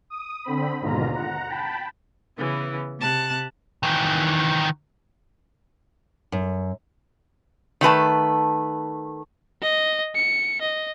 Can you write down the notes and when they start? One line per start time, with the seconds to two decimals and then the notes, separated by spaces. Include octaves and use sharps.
0.10 D#6
0.44 D3 C4 B5
0.81 D#2 G#2 B2 D3 F4 A#5
1.14 F#5 A#5
1.48 G5 A5 B5
2.37 C#3 E3 B3
3.00 C3 A5 F#6
3.83 D#3 E3
6.32 F#2
7.81 D#3 A3 B4 A5
9.62 D#5
10.15 C#7
10.61 D#5